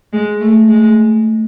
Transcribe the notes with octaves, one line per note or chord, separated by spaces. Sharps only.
G#3
A3
G#3